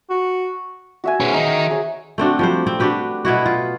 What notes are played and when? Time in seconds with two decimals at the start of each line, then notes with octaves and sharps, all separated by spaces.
0.10 F#4
1.04 F#4 E5 G#5
1.20 B3 C#4 G#4 C5
1.34 D#3 D#4
1.71 G#4 C#5
2.18 A3 C4 D4 F#4
2.39 F3 G3 C5
2.67 C4
2.80 D4 F#4 G4 B4
3.25 B2 B3 E4 F#4
3.46 F4